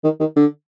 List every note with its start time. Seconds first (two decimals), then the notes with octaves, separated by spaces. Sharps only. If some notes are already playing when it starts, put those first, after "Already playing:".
0.04 D#3
0.20 D#3
0.36 D3